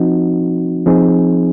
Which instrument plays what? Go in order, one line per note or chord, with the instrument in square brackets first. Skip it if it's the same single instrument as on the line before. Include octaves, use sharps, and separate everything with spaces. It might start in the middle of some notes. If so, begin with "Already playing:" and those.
Already playing: [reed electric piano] F3 C4 D#4 F#4
F3 C4 D#4 G#4